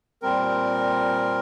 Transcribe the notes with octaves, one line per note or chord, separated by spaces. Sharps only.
A#2 G3 C4 A#4